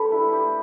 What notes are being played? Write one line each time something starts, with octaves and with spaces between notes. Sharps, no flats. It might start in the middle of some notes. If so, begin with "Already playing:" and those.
Already playing: D4 G4 A4 B4
E4
G4